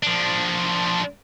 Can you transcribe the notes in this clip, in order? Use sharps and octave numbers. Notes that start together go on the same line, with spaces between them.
F3 D4